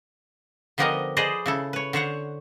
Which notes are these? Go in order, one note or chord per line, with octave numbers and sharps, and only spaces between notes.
D3 F3 B3 G4 A#4 D#5
G#4 B4 C5 D5 D#5
C#3 E4 A4
B4 C#5
D3 C5 C#5 F#5